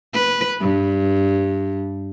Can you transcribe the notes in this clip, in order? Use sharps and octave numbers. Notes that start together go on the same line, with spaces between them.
B4
G2